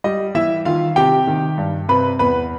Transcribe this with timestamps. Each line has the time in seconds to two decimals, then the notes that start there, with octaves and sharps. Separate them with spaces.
0.04 G3 D#5
0.35 E3 E4 E5
0.65 D#3 F4 F5
0.96 C3 G4 G5
1.27 D#3
1.58 G2
1.89 C3 B4 B5
2.19 E2 B4 B5